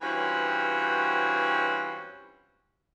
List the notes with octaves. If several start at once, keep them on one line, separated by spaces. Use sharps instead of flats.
G2 E3 C4 C#4 F4 F#4